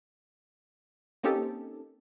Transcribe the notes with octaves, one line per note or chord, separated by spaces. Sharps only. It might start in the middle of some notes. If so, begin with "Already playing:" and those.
A#3 C4 C#4 D#4 G4 A4